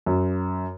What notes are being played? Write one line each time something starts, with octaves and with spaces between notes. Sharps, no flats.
F#2